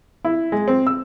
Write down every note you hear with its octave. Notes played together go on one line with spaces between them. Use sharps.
E4
G#3
C4
E6